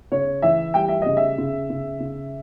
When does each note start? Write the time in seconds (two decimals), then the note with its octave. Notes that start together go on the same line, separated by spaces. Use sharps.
0.11 C#3 C#5
0.42 E3 E5
0.74 G3 G5
0.88 E5
1.02 C#3 D#5
1.17 E5
1.38 C#3
1.70 C#3
2.00 C#3